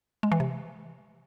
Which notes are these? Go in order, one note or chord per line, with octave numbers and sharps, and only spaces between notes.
G#3
E3
C3